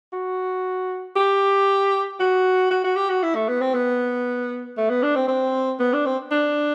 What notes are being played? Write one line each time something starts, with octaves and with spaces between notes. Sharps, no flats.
F#4
G4
F#4
F#4
F#4
G4
F#4
E4
A3
B3
C4
B3
A3
B3
D4
C4
C4
B3
D4
C4
D4